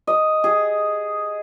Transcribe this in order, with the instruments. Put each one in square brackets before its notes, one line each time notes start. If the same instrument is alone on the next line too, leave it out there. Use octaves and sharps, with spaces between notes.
[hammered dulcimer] D#5
G#4